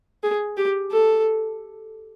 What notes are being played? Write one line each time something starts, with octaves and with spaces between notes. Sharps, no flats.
G#4
G4
A4